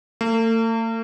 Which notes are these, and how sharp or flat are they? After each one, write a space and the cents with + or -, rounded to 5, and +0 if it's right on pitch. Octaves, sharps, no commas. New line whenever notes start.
A3 +45